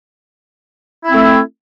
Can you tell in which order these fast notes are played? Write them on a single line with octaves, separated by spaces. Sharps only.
E4 C4 A3